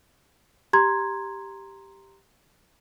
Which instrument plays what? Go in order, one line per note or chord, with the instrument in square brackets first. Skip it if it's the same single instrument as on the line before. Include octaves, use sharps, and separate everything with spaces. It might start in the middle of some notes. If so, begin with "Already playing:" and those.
[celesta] G4 A#5 C6 G#6